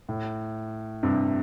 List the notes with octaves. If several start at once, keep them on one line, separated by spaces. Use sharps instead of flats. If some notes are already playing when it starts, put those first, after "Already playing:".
A2
G2 C3